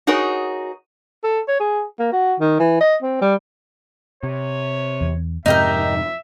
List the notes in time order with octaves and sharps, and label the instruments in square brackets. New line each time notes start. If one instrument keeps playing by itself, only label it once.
[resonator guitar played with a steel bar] D#4 F#4 G#4 A#4 C#5
[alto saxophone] A4
C#5
G#4
A#3
F#4
D#3
E3
D#5
C4
G3
[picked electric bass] C3 [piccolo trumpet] C#5
[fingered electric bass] E2
[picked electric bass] F2 G#2 C3 [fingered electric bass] C4 [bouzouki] D#4 G4 A#4 [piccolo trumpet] E5